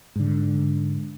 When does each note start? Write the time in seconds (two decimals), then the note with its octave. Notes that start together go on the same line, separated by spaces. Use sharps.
0.16 G#2 D3